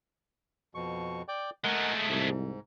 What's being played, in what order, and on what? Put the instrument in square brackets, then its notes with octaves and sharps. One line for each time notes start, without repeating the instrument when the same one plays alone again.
[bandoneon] F2 B2 C#6
D5 G5 D6
[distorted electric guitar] G#3 A3 [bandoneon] A#4 D#5 F#5
[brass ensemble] C2 [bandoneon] G#2